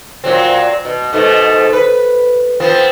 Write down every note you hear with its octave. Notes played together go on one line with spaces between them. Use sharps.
A#2 F#3 C4
B2
G#2 B2 A3
B4
F3 B3 C4